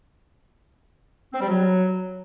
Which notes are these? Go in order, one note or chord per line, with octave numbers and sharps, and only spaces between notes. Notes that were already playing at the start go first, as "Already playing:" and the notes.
C4
G3
F#3